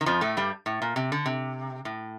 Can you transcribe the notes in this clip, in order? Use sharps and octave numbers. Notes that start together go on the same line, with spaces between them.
D#3
F2 F3
A2 A3
G2 G3
A2
A#2
C3
D3
C3
A2